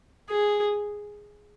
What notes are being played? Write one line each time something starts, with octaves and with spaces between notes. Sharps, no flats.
G#4